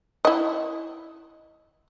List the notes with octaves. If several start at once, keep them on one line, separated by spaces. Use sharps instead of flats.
E4 D#5